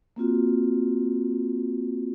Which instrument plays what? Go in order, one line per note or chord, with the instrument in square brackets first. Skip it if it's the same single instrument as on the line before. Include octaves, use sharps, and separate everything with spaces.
[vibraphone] A#3 C4 F4 F#4